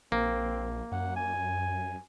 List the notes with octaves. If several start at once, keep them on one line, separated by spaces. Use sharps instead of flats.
A#1 A#3 C4
F#2 F#5
G#5